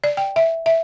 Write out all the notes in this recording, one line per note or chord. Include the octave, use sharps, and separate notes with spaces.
D5
G5
E5
E5